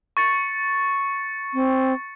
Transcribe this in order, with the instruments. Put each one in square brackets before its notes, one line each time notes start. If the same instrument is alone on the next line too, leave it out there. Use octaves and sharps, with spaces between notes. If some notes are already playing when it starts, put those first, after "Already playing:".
[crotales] C#6 A6 C#7
[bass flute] C4